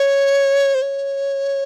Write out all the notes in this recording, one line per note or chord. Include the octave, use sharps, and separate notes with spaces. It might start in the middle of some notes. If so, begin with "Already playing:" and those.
Already playing: C#5
C5
C#5